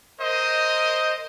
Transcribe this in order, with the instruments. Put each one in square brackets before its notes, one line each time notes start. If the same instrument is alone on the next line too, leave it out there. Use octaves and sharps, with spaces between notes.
[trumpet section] A#4 C5 D#5